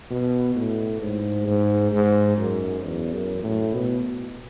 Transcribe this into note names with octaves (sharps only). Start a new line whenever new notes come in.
B2
A2
G#2
G#2
G#2
F#2
E2
F#2
A2
B2